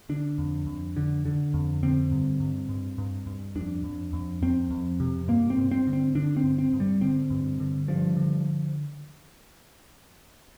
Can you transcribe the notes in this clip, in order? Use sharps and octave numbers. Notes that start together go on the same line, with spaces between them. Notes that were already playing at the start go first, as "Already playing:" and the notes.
D3 D4
F2
F2
D3
D3
F2
D3 C4
G2
G2
G2
G2
G2
F2 D4
F2
F2
F2 C4
F2
C3
G2 A#3
C4
G2
C4
D3
C4
D3 D4
C4
G2
C4
G2
G3
D3 C4
G2
D3
G2 F3
D3